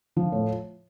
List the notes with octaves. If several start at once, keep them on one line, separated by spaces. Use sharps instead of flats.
F3
A2